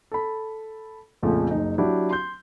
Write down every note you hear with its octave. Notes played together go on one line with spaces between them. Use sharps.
A4 B5
A#1 F2 C#3 F3 A3
F#1 D#4
F#3 D4 E4 F#4 G4
C6 G6